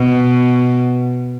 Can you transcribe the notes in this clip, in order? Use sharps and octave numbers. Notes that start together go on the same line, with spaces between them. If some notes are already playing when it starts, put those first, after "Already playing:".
Already playing: B2